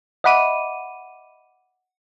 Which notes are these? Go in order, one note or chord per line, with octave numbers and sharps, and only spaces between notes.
D#5 E5 F#5 B5 D6 D#7